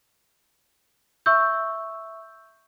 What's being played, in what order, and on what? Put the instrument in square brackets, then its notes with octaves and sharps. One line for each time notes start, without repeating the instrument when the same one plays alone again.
[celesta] E5 C#6 E6 G6